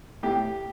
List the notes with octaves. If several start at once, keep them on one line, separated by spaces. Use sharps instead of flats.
A2 G4